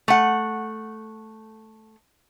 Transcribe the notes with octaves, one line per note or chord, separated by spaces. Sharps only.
A3 F#5